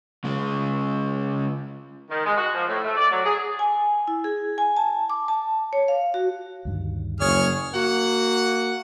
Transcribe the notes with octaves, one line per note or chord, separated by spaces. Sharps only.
C#3 G#3
D#3
G#3
F#4
F3
A2
A3
D5
F#3
G#4
G#5
E4
G#4
G#5
A5
D6
A5
C#5
F5
F#4
D2 G2 D#3
F#1 G#4 C#5 F6
A#3 F#4 F#5